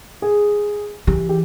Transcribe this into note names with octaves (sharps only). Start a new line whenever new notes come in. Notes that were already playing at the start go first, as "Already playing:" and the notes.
G#4
E3 G4
G4